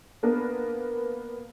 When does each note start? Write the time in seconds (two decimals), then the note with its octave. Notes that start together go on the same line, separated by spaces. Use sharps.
0.23 A#3 B3 D4 A#4 B4